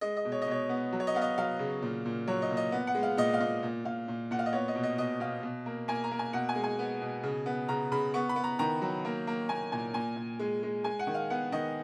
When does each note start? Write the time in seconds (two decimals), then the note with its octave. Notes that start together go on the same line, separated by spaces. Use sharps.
0.01 G#3 D#5
0.17 D#5
0.25 B2
0.32 C#5
0.42 D#5
0.47 B2 C#5
0.69 B3
0.93 F#3
1.00 C#5
1.07 D#5
1.14 B3 F5
1.22 D#5
1.38 F#3 F5
1.59 C#3
1.82 A#2
2.05 A#2
2.28 F#3 C#5
2.42 D#5
2.51 A#2
2.57 D#5
2.72 B3
2.87 F#5
2.95 G#3
3.03 F5
3.17 A#2 D#5
3.34 F5
3.40 A#2 D#5
3.63 A#2
3.85 A#2 F5
4.08 A#2
4.31 A#2 F#5
4.39 F5
4.46 D#5
4.53 B3 C#5
4.68 D#5
4.76 B2
4.83 D#5
4.98 B2 D#5
5.20 B2 F5
5.43 B2
5.66 A#3
5.88 A#3 G#5
6.04 A#5
6.11 A#3
6.19 G#5
6.33 B2 F#5
6.49 G#5
6.55 G#3
6.64 G#5
6.79 B3
7.02 B2
7.23 C#3
7.46 B3
7.69 C#3 A#5
7.92 C#3 B5
8.14 B3 C#6
8.29 B5
8.36 B3
8.44 A#5
8.59 D#3 A#5
8.82 F#3
9.05 A#3
9.27 A#3
9.49 A#3 G#5
9.72 A#2 G#5
9.94 A#2 G#5
10.16 A#2
10.39 G#3
10.63 G#3
10.84 G#3 G#5
10.99 F#5
11.07 D#3
11.14 F5
11.30 B3 F#5
11.52 D#3 D#5